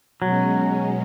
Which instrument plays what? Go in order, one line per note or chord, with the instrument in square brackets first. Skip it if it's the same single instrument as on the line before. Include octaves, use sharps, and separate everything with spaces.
[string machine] B2 G#3 C#4 [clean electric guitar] F#3